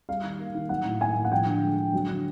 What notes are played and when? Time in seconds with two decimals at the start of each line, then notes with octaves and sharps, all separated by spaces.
0.09 G3 F5
0.23 D#3
0.39 A#3
0.55 D#3
0.69 F#3 F#5
0.85 A2
1.01 A#3 G#5
1.16 A2
1.25 F#5
1.32 F3 G5
1.46 D3
1.63 G#3
1.78 D3
1.93 F#3
2.08 D3